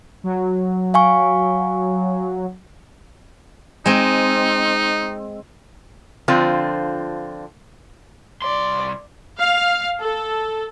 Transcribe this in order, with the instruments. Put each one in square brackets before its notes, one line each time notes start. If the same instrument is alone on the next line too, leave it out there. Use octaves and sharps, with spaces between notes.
[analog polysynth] F#3
[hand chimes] F5 G#5 C#6
[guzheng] G#3 C4 [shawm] D#4
[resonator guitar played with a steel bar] D3 F3 C4 D4 F4
[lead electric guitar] C2 C6 [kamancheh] D5
[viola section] F5
A4